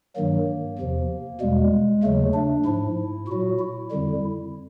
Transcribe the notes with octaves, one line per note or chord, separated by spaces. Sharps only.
G2 D#3 F#3 A#3
E2 C3 F3
E2 B2 G3 G#3
D#2 C#3 F#3 A3
D4
G#2 F3 E4
A#2 F#3 F#4
E4
F2 D3 G3